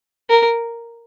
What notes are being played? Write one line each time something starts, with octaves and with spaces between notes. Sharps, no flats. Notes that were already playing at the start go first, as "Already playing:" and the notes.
A#4